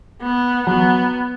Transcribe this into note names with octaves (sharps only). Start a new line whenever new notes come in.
B3
F#3 B3